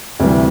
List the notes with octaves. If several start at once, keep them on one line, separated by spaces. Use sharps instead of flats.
D2 C3 E3 G3